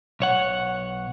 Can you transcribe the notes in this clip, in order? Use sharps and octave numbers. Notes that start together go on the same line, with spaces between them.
B1 C#5 F#5